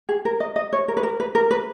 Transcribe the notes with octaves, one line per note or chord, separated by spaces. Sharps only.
G#4
A#4
D#5
D#5
C#5
A#4
B4
A#4
B4
A#4
B4